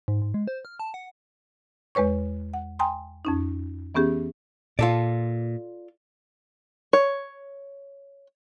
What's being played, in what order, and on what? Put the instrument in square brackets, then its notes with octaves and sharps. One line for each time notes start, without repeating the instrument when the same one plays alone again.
[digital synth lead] G#2
G#2
G#3
C5
F6
A5
F#5
[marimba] E2 G#3 B4 C#5 C#6
F#5
G5 G#5 A#5 C6 D#6
F2 C#4 D#4
E3 B3 C#4 G4 G#4
[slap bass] A#2 [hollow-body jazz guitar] F4 A4 D5
[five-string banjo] C#5